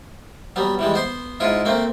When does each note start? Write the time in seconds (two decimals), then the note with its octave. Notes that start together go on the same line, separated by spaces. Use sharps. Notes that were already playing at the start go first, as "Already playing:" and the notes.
0.56 F#3 G3 B3
0.79 E3 G3 G#3
0.94 B3 C5 C6
1.40 G#2 G#3 E4 F4
1.65 A3 A#3 C4